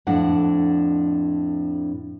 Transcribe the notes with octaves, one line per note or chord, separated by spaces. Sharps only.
F2 A2 D4 F#5